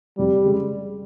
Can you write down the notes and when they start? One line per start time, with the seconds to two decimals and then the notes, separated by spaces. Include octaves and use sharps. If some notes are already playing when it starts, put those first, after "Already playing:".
0.18 F1 G3
0.43 C#3 G#3